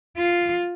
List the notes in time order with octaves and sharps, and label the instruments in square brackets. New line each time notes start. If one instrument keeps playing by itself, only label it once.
[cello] F4